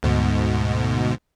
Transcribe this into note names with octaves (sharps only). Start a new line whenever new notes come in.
D2 G#2 B2